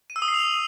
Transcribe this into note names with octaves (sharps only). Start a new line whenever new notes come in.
D#7
E6
D#6
C7
F7